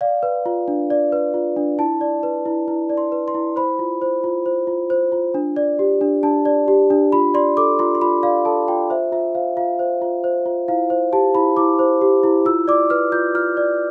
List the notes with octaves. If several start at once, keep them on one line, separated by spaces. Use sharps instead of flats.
D5 F5
B4
F4
D4
D5
B4
F4
D4
E4 A5
D5
B4
E4
E4
D5
C6
B4
C6
E4
C5 B5
F4
C5
F4
C5
F4
C5
F4
D4
D5
G4
D4
D4 A5
D5
G4
D4
F4 B5
D5 C6
A4 D6
F4 C6
C6
F4 B5
D5 F5
A4 A5
F4 G5
C5 E5
F4 E5
C5 F5
F4 F5
C5
F4
C5
F4
E4 F5
C5
G4 A5
E4 B5
E4 D6
C5
G4
E4
F4 E6
D5 D6
B4 F6
F4 G6
F4 F6
D5